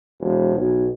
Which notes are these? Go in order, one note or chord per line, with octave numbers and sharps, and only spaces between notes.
E1
B1